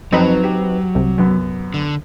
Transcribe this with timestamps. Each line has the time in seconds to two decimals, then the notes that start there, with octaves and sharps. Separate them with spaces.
0.12 F2 F#3 C4 D#4 B4
0.44 G4
0.95 C2 C3
1.18 F#2 B3
1.74 D3